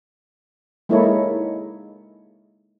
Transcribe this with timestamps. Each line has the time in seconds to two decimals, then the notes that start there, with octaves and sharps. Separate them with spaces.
0.89 G#3 A#3 D#4 E4 A4 C#5